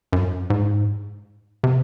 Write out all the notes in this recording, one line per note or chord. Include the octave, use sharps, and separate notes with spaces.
F#2
G#2
C3